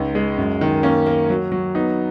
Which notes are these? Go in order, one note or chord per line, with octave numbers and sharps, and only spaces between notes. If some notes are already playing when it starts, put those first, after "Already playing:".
Already playing: C#2 D#4
G#3
F#2
D#3
A#3 C#4
A#3
F#3
F#3
B3 D#4